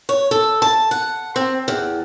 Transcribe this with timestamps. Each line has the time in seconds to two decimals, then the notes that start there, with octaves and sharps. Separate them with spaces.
0.09 C#5
0.31 A4
0.62 A5
0.91 F#5
1.36 C4
1.68 E2